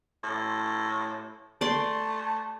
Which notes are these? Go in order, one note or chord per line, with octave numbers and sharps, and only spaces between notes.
A2
A3 D5 C6